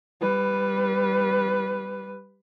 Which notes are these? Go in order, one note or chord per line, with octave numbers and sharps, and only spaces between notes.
G3 B4